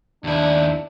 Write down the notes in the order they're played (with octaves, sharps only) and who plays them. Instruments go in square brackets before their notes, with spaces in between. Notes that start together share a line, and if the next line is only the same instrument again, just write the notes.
[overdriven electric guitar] D#2 E4 [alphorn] D4